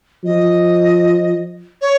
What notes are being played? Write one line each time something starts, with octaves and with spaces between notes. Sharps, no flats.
F3 D#5
C#5